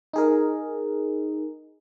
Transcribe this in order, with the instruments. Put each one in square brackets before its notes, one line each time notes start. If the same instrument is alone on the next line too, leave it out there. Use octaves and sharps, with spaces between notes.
[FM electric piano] D#4 G#4 A#4